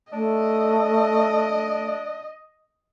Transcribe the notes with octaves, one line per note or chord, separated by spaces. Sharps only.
A3 D4 D#5